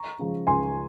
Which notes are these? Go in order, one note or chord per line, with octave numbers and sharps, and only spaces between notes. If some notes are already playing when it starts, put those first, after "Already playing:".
Already playing: A#5 C#6
C#3 F3 G#3
C#2 G#5 C6